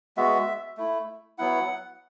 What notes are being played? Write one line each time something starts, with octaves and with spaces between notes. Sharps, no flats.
G#3 B3 F#4 E5
A3 E4
F#3 B3 E4 F#5